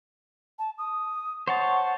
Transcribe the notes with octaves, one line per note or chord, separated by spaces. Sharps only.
A5
D#6
C5 C#5 F#5 A5